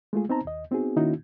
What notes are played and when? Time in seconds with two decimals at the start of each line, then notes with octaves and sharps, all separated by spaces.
0.13 G#3 A3 F4 G#4
0.29 B3 C4 D#4 C5 A5 A#5
0.45 D#2 D#5
0.71 B3 C4 D#4 F#4 G#4
0.96 D#3 A#3 C#4 D#4 E4 F#4